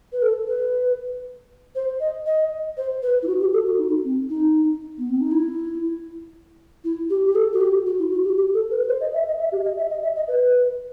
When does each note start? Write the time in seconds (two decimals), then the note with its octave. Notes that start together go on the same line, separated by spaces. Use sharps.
0.13 B4
0.22 A4
0.47 B4
1.75 C5
2.00 D#5
2.26 D#5
2.77 C5
3.02 B4
3.23 E4
3.28 F#4
3.40 G4
3.53 A4
3.66 F#4
3.78 D#4
4.04 C4
4.30 D#4
4.98 B3
5.10 C4
5.21 D#4
5.31 E4
6.84 E4
7.10 G4
7.25 G4
7.35 A4
7.53 F#4
7.60 G4
7.86 F#4
7.99 E4
8.11 F#4
8.24 G4
8.37 G4
8.54 A4
8.71 B4
8.82 B4
8.88 C5
9.00 D#5
9.14 E5
9.26 D#5
9.39 E5
9.52 G4
9.64 D#5
9.77 E5
9.90 D#5
10.03 E5
10.15 D#5
10.28 B4